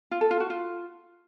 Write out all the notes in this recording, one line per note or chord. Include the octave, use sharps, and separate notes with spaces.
F4
A4
F4
F#4
F4